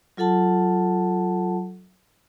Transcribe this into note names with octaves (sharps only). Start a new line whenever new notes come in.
F#3 F4 A4 F#5 A5